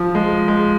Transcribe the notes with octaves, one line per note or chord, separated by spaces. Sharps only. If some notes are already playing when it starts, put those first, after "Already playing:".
Already playing: F3
G#3
G#3